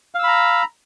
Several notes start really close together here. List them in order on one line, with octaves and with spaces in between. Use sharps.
F5 E6 B5 A#5